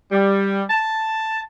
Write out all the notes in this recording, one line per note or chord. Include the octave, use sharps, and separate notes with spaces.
G3
A5